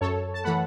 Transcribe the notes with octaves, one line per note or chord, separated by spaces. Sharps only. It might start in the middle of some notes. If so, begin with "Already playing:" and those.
F#2 A4 C#5
A5
E3 A3 F#5 B5